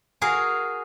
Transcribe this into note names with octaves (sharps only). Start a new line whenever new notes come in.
F#4 G#4 A#4 F5 G#5